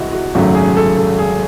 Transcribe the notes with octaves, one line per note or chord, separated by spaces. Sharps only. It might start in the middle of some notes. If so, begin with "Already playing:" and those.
Already playing: C2 C3 E3 G#3 E4 F#4
F#4
G#1 F#2 C#3 F#3 A3 F#4
G#4
A4
A4
G#4